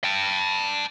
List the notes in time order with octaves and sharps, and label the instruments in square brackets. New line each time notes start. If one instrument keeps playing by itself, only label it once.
[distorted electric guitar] G5 A5